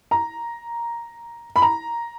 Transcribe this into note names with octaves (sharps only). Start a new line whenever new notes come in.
A#5
B5
A#5